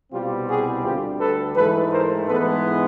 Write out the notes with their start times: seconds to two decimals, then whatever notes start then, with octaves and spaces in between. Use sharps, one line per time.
0.12 C2 B2 G3 C4 F4 G4
0.48 F#4 G#4
0.84 D2 D3 G3 F4 G4
1.20 A4 B4
1.56 G#2 E3 A3 A4 B4
1.92 A#4 C5
2.27 G#2 E3 G#3 B3 A4 B4